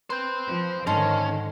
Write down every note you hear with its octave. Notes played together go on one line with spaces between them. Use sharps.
B4 C5 G5
F3
G#2 D3 D#3 C#4 C5 C#5 A5